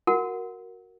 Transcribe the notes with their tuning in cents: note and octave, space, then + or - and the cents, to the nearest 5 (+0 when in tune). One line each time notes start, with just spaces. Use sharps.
F#4 +0 A#4 +0 F#5 -10